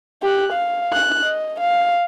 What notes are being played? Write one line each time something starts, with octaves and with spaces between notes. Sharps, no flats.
G4 F#6
F5
F#6
D#5
F5